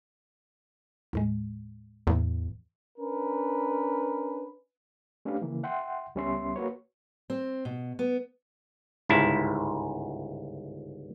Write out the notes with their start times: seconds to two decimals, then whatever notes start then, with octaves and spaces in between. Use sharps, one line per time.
1.13 D#2 A2 G#3
2.07 E2 A2 E3
2.98 C#4 D4 A#4 B4
5.25 A3 C#4 D4 G4 B4 F5
5.42 C#3 E3 A#3
5.63 E5 F#5 G5 C6
6.15 C#2 G3 B3 C#4 E5 C6
6.56 A#3 F#4 B4 C#5
7.30 C4
7.65 B2
7.99 B3
9.09 G1 C#2 G#2 E4 A5